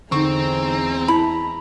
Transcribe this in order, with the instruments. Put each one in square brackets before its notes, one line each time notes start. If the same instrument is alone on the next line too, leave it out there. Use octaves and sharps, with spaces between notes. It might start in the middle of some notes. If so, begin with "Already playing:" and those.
[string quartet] E2 G#3 A#5 [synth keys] D3 D#4 [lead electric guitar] C4 [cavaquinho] C#6
[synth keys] E4 A5 [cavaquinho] B5